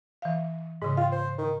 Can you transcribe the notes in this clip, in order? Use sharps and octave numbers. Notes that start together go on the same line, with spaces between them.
E3 F5
G#2 C#3 G#3
F4 F5 G5
C5
D#3